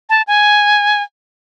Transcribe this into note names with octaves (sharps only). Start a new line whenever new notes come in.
A5
G#5